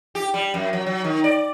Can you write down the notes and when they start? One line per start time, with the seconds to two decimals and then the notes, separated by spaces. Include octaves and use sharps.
0.15 G4
0.34 G3
0.54 F#2
0.73 F#3
0.86 F#3
1.04 D#3
1.24 D5